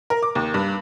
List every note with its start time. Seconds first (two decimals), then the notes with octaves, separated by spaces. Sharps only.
0.10 A#4
0.22 D6
0.35 D#2
0.54 G2